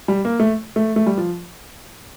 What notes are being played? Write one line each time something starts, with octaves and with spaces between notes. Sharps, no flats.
G3
A#3
A3
A3
A3
G3
F3